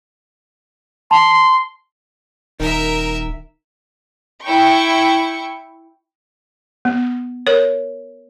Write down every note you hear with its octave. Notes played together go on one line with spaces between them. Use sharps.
A5 C6
D#1 D#3 A#4 E5
E4 G5 C#6
B3
A#4 C#5